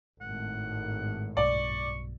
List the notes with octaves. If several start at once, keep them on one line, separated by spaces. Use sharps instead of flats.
G#1 A2 F#5
B1 G2 B2 D5 C#6